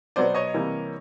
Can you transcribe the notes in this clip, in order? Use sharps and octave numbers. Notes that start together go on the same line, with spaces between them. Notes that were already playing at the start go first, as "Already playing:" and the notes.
B2 F#3 B3 C5 D5
C#5 D#5
C3 E3 G3 A#3